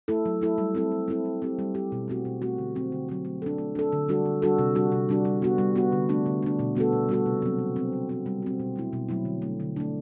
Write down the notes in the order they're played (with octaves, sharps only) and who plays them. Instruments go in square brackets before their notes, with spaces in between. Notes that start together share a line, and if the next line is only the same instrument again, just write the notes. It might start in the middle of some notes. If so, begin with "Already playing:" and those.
[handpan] A3 E4 A4
F#3
A3 E4 A4
G3
C4 E4 A4
G3
C4 E4 A4
G3
C4 G4
G3
C4 G4
B2
A3 C4 F#4
B2
A3 C4 F#4
D3
F#3 C4
D3
F#3 C4
A3
D4 A4
A3
D4 A4
D3
G3 D4 F#4 A4
D3
G3 D4 F#4 A4
C3
G3 D4 F#4
C3
G3 D4 F#4
G3
B3 F#4
G3
B3 F#4
D3
A3 D4
D3
A3 D4
B2
G3 B3 F#4 A4
B2
G3 B3 F#4 A4
C3
F#3 C4
C3
F#3 C4
G3
C4 F#4
G3
C4 F#4
B2
F#3 A3 E4
B2
F#3 A3 E4
D3
A3 D4
D3
A3 D4